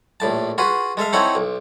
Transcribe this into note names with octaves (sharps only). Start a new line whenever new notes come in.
A#1 A2 A5
F4 F#4 G#4 B4
G#3 A4 E5 F5
C4 D#4 E4 A4 C#5 F#5
B1